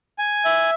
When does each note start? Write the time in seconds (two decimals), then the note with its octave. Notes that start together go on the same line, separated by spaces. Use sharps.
0.18 G#5
0.45 E5